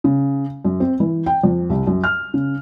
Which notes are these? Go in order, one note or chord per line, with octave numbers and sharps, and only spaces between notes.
C#3
F#2
C4
E3
G5
F2
C2
F#2
F6
C#3